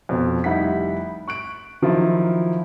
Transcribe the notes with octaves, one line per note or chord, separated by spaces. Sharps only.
F2 B2
F1 G3 D#4 E4 F#5 B6
C#6 F#6 D7
D#3 F3 F#3 E4